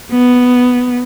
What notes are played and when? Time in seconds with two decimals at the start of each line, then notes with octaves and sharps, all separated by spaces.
0.11 B3